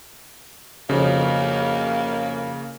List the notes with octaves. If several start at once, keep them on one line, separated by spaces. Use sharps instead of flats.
B1 F2 C#3 A#3